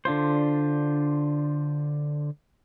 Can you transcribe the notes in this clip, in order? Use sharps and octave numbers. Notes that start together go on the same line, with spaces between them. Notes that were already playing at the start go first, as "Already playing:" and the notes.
D3 D4 F4 C5